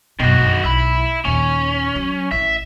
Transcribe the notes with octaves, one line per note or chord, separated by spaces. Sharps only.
F#2 B2 D#3 F#4
F#2 D3
B1 E5 B5
D#2 A#2 C#4
F#3
A1 E5